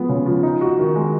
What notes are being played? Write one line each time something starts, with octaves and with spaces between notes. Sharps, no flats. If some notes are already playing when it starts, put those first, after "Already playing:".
Already playing: F3 G#3 B3
C#3
F3
D#4
F#4
D#3
G#3